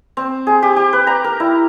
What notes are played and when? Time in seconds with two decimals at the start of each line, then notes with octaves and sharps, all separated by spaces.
0.17 C4
0.47 G#4
0.62 G4
0.76 G4
0.93 B4
1.07 A#5
1.24 A#4
1.40 E4